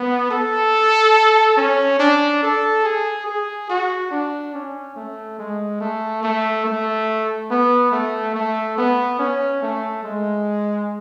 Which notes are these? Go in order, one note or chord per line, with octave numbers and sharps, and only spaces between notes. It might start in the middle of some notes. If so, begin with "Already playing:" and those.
Already playing: B3
A4
C#4
D4
A4
G#4
G#4
F#4
D4
C#4
A3
G#3
A3
A3
A3
B3
A3
A3
B3
C#4
A3
G#3